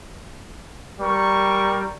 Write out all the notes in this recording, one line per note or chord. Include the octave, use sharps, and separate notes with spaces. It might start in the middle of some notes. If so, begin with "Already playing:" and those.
G3 A#4 C#6